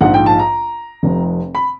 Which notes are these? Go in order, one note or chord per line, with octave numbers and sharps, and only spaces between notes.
A#1 G#2 F3 F#5
G5
A5
A#5
F1 F2 C3
B5